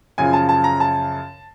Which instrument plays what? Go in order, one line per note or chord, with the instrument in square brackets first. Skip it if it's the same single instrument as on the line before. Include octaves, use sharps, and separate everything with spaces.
[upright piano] F#2 C#3 F3 G#5
A5
A5
A#5
A5